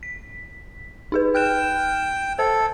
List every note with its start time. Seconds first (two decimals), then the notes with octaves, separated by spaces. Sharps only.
0.03 B6
1.12 D#4 G#4 B4
1.35 G5 F6 F#6 E7
2.39 A4 C5